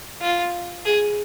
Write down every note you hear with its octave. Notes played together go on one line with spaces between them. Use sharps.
F4
G#4